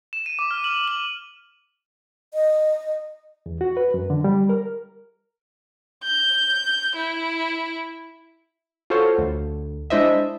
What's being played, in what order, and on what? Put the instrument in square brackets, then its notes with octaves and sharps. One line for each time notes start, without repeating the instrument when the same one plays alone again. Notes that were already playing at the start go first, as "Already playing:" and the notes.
[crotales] E7
D#7
D6
F6
F#7
F#7
[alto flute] D#5
[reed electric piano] E2
F#4
B4
F#2
D3
G3
A#4
[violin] G6
E4
[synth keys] F4 F#4 A4 C5 C#5
D2
G#3 D4 E4 C5 D#5 E5